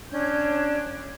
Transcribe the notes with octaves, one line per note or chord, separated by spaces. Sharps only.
C#4 D4 C#5 G6